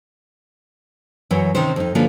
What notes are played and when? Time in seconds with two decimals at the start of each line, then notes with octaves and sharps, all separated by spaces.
1.31 F#2 E3 F#3 C#5
1.55 C3 D#3 C#4 C5
1.76 F2 D#4
1.95 D3 F3 A#3 C#4 F4 B4